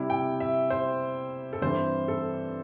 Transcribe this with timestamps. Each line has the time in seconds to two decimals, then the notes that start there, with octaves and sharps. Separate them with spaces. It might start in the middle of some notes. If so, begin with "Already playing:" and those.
Already playing: C3 G3 E4
0.10 G5
0.40 E5
0.70 C5
1.53 A4
1.61 G2 E3 C4 C5
2.08 A4